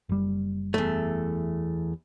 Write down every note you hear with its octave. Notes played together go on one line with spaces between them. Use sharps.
F#1 G3
E2 A3